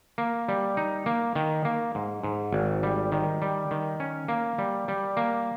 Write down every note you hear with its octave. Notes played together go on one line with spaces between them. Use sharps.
A#3
G3
D#4
A#3
D#3
A#3
G#2
G#2
G#1
G3
D#3
G3
D#3
C#4
A#3
G3
G3
A#3